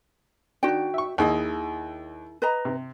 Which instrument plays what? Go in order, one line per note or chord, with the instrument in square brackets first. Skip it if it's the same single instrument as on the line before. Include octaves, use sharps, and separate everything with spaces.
[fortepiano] D#3 D4 [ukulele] F#4 G5
[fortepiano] E5 C#6
[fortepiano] D#2 [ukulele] E4 G#4 D#5
[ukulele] B4 D#5 A#5
[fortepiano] C3